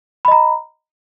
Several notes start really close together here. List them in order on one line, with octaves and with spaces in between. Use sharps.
B5 D#5 A#5